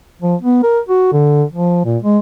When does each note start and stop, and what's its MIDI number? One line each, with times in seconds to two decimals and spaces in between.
0.22 0.35 53
0.42 0.61 59
0.63 0.79 70
0.89 1.09 66
1.12 1.44 50
1.52 1.81 53
1.85 1.97 46
2.02 2.19 56